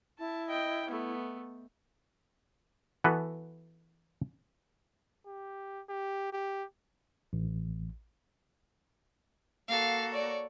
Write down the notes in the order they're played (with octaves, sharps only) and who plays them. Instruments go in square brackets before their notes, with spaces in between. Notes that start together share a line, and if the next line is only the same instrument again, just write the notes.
[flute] E4 [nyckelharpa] A5
[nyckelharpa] D#5 G5
A3 B3
[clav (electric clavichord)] E3 B3 F#4 A4 B4
[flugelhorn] G4
G4
G4
[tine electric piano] A1
[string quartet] A#3 F#4 A4 [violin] F5
[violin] C#5 D5